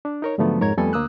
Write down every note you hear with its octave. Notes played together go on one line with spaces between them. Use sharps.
D4
D#4 A#4 C#5
G#2 D3 F3 F#3 A3 B3
F2 G#2 A#4 C#5 A#5 G#6
F2 G3 A3 B3 A4 G#5
D2 A#3 D#6 E6 F#6